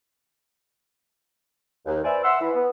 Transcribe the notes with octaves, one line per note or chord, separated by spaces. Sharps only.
D#2
B4 C5 D5 E5 G#5
E5 F#5 C6 E6
E3
B3